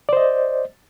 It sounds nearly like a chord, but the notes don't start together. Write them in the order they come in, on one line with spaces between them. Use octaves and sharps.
D5 C5 D#5